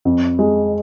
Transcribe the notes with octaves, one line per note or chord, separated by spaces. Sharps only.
F2
G#3